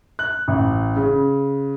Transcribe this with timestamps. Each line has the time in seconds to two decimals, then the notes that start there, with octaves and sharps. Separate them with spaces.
0.19 F#6
0.48 A1
0.96 C#3